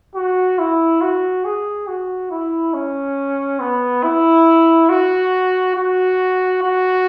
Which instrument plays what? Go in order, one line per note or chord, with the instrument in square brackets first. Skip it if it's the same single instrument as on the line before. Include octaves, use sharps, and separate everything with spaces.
[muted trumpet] F#4
E4
F#4
G#4
F#4
E4
C#4
B3
E4
F#4
F#4
F#4